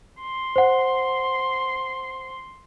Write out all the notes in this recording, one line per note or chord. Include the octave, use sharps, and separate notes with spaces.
C6
C5 F#5